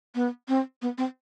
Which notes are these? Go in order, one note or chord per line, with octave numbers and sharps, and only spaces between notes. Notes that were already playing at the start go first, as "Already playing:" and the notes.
B3
C4
B3
C4